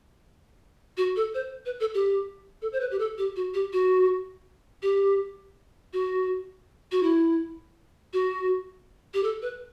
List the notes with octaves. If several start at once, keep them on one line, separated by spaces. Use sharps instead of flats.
F#4
A4
C5
B4
A4
G4
A4
C5
B4
G4
A4
G4
F#4
G4
F#4
G4
F#4
F#4
E4
F#4
G4
A4
B4